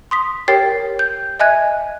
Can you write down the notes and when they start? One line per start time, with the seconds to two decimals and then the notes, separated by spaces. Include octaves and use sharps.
0.11 C6 D#6 B6
0.48 G4 A#4 C#5 G5 A6 C7
0.99 G6
1.40 D#5 E5 G#5 F#6 G#6